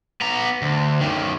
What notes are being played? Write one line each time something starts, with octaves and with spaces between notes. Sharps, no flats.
B3 A#5
D2
F#2 D#3